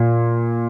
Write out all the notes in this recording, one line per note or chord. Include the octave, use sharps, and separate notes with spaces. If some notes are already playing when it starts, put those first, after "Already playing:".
Already playing: A#2